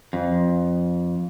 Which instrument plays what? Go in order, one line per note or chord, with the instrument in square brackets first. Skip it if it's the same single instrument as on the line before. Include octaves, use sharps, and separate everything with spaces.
[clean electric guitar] F2